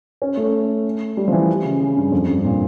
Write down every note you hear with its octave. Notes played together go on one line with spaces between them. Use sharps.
C#4
A3
G3
F3
E3
C#3
C#3
G2
F2
G2
A#2